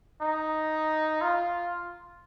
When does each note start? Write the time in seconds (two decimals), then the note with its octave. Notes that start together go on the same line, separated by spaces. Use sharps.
0.22 D#4
1.21 F4